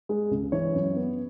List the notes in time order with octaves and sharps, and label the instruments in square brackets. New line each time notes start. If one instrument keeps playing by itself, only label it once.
[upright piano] G#3
C#2
E3 C#5
F#2
B3